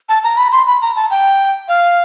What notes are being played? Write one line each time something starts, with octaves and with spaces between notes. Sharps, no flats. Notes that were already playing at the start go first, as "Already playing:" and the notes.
A5
A#5
B5
C6
B5
A#5
A5
G5
F5